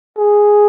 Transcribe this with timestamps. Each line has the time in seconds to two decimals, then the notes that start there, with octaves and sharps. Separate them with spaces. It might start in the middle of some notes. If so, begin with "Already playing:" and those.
0.17 G#4